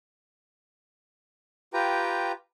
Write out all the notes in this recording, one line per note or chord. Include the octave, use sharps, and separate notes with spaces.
F4 G4 B4 G5 A#5